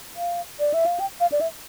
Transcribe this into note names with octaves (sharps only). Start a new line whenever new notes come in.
F5
D5
E5
F5
G5
F5
D5
E5